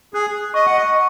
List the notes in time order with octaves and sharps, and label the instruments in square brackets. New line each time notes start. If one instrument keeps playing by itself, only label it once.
[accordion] G#4 [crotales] F#6
[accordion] D#5 [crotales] C#6
[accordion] F#5
D#5